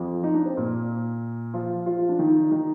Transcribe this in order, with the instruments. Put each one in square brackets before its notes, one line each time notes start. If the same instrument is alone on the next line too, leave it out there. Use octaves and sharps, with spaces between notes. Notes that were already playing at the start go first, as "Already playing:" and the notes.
Already playing: [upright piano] F2 F3
D#4
D4
C4
A#2 A#3
F3 F4
F3 F4
D4
D#3 D#4
D#3 D#4